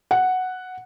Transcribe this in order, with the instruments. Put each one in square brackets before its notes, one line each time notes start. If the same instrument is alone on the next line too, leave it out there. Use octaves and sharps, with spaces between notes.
[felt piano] F#5